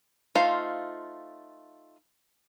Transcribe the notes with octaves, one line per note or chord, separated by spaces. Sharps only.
A3 D#4 F4 C5 F5